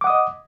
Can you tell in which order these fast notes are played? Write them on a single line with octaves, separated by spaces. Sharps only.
D6 F#5 D#6 D#5